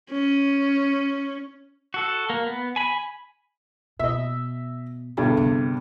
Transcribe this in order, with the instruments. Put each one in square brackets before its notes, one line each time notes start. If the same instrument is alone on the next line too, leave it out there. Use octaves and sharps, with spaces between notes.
[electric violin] C#4
[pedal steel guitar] F#4 A4
A#3
B3
G#5 B5
[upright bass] B2 [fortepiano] D#5 E5
[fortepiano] E2 G2 D3 [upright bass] B2
[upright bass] C3